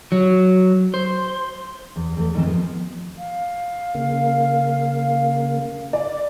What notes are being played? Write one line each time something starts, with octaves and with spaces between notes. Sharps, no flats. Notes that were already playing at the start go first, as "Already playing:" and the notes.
F#3
C5
E2
E2 A3
G#2 D#3 E3 G#3 C4
F3 B3
F5
C#3 A#3
D5